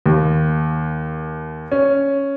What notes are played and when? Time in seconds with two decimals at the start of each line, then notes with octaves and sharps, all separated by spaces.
0.06 D#2
1.72 C#4